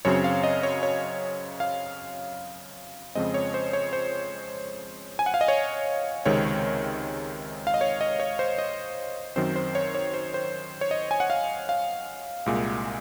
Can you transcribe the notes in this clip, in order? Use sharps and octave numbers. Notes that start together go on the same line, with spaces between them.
F#2 C#3 F#3 C4 C#5
F5
D#5
C#5
C#5
F5
F2 C#3 F3 G#3 C4 D#5
C#5
C5
C#5
C5
G#5
F#5
F5
D#5
C#5
C#2 C3 D#3 G#3 C4 C#5
F5
D#5
C#5
D#5
C#5
C5
D#5
F#2 D#3 F#3 C4 C5
C5
C#5
C#5
C5
C5
C#5
D#5
G#5
F#5
F5
F5
C2 A#2 G#3